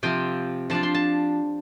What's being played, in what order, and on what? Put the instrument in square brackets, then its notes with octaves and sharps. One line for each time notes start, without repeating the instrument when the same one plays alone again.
[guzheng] C3 F3 C4 F4 G5
F3 D4 F4 A5
C6
A5